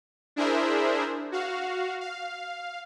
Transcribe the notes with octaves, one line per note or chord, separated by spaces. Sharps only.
D4 E4 G#4 A#4 C5 E5
F#4 F5
F5